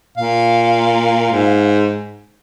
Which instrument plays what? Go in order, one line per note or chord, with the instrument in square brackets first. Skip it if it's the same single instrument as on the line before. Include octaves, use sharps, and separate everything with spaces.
[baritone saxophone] A#2 [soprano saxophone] F5
[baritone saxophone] G#2